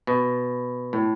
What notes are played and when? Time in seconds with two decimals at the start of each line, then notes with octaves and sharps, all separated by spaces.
0.07 B2
0.93 A2